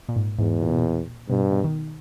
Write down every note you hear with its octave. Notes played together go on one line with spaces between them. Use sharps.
A#2
G#2
E2 G#2
A#2
B2
A#2
G2 B2
B2
D#3